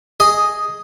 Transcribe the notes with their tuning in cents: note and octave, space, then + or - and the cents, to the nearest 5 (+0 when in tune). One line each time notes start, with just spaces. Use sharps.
G#4 +0 D#5 +0